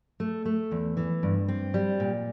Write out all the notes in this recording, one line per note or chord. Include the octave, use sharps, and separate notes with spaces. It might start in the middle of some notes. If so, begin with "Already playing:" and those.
A3
A3
E2
E3
G2
C4
G3
A#2